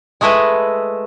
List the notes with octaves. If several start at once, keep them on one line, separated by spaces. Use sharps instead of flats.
G#3 A3 E4 B4 D#5